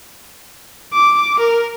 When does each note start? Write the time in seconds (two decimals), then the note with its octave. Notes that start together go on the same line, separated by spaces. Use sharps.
0.93 D6
1.40 A#4